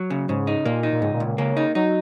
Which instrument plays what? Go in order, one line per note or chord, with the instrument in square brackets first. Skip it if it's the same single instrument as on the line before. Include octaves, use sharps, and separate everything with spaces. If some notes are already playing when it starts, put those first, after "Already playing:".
Already playing: [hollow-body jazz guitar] F#3
C#3
[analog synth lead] G#2 [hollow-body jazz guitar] C#3
[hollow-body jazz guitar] D#4
[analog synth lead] A#2 [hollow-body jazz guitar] A#3
[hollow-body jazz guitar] D#4
[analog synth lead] A#2
[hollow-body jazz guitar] C#2 [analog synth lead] G#2
[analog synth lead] A#2
[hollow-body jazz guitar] C#2
[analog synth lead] A#2
[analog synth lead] C#3 [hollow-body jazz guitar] A#3
[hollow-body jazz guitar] D#4
[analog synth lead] F#3 [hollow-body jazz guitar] D#4